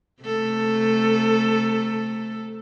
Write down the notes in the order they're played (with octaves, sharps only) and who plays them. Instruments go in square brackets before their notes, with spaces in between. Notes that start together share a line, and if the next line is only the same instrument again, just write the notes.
[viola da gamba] C3 A3 A4